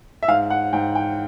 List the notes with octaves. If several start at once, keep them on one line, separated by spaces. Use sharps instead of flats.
E5
G#2 F5
F#5
G#2 G5
G5